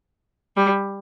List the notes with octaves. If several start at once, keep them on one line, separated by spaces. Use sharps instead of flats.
G3